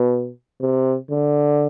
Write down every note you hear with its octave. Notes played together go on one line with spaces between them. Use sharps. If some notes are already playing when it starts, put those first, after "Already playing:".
Already playing: B2
C3
D3